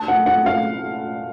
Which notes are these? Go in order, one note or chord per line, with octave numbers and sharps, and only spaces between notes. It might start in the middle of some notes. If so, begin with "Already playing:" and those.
Already playing: A5
F#5
F#5
F5